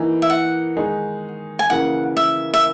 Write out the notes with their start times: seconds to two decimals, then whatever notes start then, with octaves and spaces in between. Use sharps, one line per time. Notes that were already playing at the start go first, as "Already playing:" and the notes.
Already playing: E3 A#3 D#4
0.22 E5
0.30 F#5
0.76 D#3 G#3 D#4 G#4
1.59 G#5
1.70 C#3 E3 A#3 F#5
2.17 E5
2.54 E5